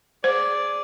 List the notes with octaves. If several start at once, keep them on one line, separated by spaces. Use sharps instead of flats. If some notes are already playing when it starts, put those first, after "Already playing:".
G#4 C5 D5